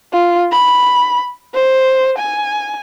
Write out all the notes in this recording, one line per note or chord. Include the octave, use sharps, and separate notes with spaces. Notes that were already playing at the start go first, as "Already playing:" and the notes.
F4
B5
C5
G#5